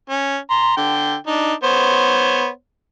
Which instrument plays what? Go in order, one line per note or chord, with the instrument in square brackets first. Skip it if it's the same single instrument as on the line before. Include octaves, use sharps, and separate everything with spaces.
[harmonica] C#4
A#5 C6
D3 G5
D4 D#4
B3 C5 C#5